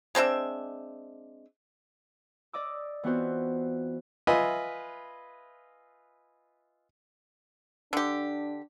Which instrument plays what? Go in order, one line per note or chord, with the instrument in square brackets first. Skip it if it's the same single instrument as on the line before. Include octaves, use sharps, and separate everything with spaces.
[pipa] G#3 C4 D4 E5
[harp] D5 D#5 D6 E6
E3 B3 C4 F4 F#4 C5
[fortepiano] F4 B4 D#5 E5 G#5
[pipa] D3 G4 [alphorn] D4